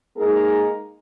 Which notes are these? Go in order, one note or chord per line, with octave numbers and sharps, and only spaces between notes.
G#3 A#3 D#4 G#4 A#4